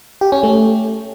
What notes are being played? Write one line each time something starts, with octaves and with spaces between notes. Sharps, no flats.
G4
C#4
A3